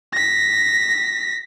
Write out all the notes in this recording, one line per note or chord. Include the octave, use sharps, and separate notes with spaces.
A#6 B6